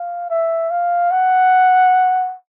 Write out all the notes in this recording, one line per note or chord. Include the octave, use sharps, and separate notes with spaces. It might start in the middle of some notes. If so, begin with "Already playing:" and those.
Already playing: F5
E5
F5
F#5